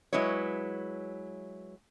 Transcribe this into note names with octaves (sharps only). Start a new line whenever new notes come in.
F#3 G#3 E4 B4 C#5